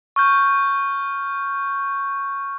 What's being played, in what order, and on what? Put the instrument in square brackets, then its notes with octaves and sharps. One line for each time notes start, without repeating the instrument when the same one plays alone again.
[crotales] C#6 F6 G6